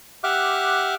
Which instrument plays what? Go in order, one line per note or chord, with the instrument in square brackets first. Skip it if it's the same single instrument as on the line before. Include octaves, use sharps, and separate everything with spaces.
[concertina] G4 E5 F#5 D6 F6 F#6